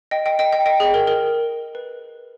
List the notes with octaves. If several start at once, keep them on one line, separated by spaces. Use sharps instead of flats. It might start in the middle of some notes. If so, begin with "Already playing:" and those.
D#5 G5
D#5 G5
D#5 G5
D#5 G5
D#5 G5
G#4
A#4
A#4
B4